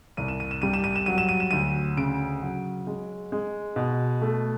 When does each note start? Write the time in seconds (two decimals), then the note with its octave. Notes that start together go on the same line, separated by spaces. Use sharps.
0.17 C2 D#7
0.28 E7
0.40 D#7
0.51 E7
0.62 G3 D#7
0.73 E7
0.84 D#7
0.96 E7
1.06 F#3 D#7
1.18 E7
1.29 D#7
1.40 E7
1.51 D2 D#7
1.97 C#3 D7
2.42 F#3
2.87 G#3
3.32 G#3
3.76 B2
4.22 A3